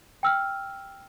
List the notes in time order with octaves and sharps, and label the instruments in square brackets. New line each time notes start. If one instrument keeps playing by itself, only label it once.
[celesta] G5 E6 F6